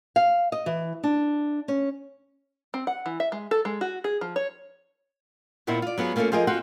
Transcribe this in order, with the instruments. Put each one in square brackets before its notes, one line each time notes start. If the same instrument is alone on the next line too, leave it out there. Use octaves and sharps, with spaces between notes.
[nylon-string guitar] F5
D#5
E3
D4
C#4
[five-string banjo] C4
F#5
E3
E5
G#3
A4
G#3
F#4
G#4
F3
C#5
[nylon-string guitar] D#2 A#2 A#3 B3 E4 C5
F4 D5
F#3 B3 F4 G#4
A3 A#3 C#4 E4 F4 A4
F3 F4 G4 G#4 A#4 D#5
C4 F4 F#4 F#5